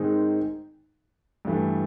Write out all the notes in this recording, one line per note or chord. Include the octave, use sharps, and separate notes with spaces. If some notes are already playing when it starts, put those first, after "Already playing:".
Already playing: G#2 D#3 G#3 C4 D#4
G2 E3 A3